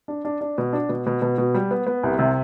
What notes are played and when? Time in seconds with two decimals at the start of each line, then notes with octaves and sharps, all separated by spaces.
0.08 D4
0.25 D4
0.41 D4
0.58 B2
0.73 D4
0.89 B2
1.06 B2
1.22 B2
1.38 B2
1.54 G3
1.71 B3
1.87 B3
2.03 C2
2.19 C3